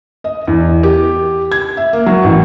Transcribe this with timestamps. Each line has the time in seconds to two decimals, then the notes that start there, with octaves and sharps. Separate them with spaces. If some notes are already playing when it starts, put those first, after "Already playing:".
0.24 D#5
0.48 E2
0.83 G4
1.52 G#6
1.77 E5
1.93 A#3
2.06 F#3
2.24 A1